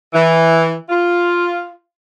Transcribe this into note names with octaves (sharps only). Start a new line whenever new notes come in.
E3
F4